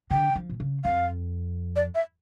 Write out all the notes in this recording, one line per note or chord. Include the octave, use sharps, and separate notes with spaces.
D3 G5
F3
A#2
C#3
F2 F5
D5
E5